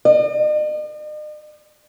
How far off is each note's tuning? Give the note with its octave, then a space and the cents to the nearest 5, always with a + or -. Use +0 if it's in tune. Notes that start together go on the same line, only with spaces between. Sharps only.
D#5 -45